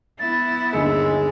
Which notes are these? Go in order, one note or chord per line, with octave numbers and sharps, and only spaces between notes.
B3 E4 A6
G1 D#2 G#3 E6 C#7